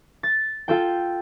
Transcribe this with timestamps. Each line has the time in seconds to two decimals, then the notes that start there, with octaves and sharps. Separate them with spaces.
0.23 A6
0.68 F4 A4 G5